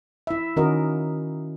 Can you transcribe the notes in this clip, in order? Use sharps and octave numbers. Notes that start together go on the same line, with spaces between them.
E4 E5
D#3 C#4 F#4 A#4 D#5